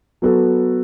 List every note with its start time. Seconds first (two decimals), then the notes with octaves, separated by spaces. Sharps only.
0.22 F#3 B3 F#4 A4